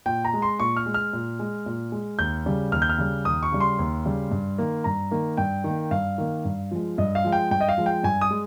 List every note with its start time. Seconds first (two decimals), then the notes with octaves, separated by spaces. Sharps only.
0.06 A#2 G5
0.25 A#5
0.33 G#3
0.42 C6
0.59 A#2 C#6
0.77 F6
0.86 G#3
0.94 F6
1.13 A#2
1.39 G#3
1.66 A#2
1.92 G#3
2.19 D#2 G6
2.46 C#3 G3
2.72 D#2 F6
2.82 G6
2.90 F6
2.98 C#3 G3
3.25 D#2 D#6
3.43 C#6
3.52 C#3 G3
3.60 C6
3.79 D#2
4.05 C#3 G3
4.31 G2
4.58 D#3 A#3
4.84 G2 A#5
5.11 D#3 A#3
5.37 G2 G5
5.64 D#3 A#3
5.91 G2 F5
6.18 D#3 A#3
6.45 G2
6.71 F3 G#3
6.98 G2 D#5
7.15 F5
7.24 F3 G#3
7.32 G5
7.51 G2 G5
7.61 D#5
7.69 F5
7.78 F3 G#3
7.86 G5
8.03 G2 G#5
8.21 D#6
8.30 G#3